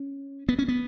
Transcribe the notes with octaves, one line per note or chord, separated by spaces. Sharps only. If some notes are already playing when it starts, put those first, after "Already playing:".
Already playing: C#4
B3
C#4
B3